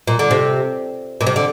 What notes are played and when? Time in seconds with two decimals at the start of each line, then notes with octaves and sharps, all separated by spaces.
0.07 A#2
0.19 D3
0.31 C3
1.21 A#2
1.27 C3
1.36 D3